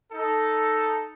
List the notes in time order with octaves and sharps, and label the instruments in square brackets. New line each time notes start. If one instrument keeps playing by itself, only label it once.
[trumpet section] D#4 A4